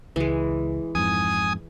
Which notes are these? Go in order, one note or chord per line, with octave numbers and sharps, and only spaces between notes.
C#2 E3 G#3
F2 G#2 G#5 D#6